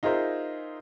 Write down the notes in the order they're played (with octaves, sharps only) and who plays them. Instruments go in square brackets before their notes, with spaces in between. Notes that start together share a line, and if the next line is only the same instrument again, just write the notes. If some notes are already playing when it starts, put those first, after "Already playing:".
[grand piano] D#4 F4 G#4 A#4 C5 E5